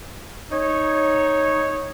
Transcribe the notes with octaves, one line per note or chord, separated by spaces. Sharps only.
D#4 C#5